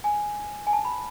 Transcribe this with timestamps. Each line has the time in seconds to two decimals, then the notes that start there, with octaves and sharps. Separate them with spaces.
0.04 G#5
0.67 G#5
0.73 A5
0.85 B5